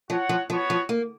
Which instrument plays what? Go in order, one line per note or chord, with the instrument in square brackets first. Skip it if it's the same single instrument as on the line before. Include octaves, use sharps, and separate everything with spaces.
[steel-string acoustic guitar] F3 [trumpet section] F#4 C#5 F#5
[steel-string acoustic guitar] F3
[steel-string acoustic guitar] F3 [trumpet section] B3 F#4 C#5
[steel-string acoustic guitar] F3
A#3